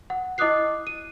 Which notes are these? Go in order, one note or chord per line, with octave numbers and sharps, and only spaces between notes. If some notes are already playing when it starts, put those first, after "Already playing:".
F#5
E4 D#5 D6 D#6 F#6 C7
D#7